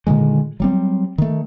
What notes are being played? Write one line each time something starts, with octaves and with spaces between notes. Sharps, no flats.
A#2 D3 D#3 G#3
F#3 G3 C4
D#3 A3